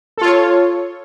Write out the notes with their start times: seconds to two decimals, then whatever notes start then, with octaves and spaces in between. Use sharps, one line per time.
0.17 A4
0.21 F4
0.25 C#5